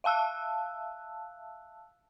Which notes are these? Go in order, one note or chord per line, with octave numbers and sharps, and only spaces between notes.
E5 F5 A5 E6 F#6